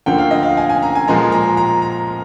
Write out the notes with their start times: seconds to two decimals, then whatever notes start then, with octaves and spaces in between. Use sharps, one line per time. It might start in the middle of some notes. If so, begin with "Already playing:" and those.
0.06 D2 D3 F3 A#3 G5
0.18 F5
0.31 D#5
0.43 F5
0.57 G#5
0.69 G#5
0.82 A#5
0.95 G#5
1.08 A#2 F3 G#3 A#5
1.32 A#5
1.57 A#5
1.82 A#5